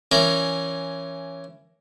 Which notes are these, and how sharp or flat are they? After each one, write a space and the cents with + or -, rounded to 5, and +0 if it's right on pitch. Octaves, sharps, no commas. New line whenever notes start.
E3 +20 C#4 +0 A#4 +0